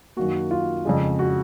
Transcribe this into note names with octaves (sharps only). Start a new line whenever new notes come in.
F#2 D#3 A#3 F#4
F4
F2 C#3 G#3
F#4